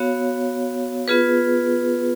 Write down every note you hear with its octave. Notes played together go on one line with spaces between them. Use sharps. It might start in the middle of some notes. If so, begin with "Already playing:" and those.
Already playing: B3 F#4 C#5 F5
B3 F4 G#4 B4